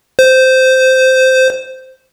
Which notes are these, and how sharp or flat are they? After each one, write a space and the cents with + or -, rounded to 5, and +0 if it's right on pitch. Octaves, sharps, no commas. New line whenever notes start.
C5 -10